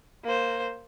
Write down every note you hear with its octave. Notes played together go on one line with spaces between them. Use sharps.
A#3 C5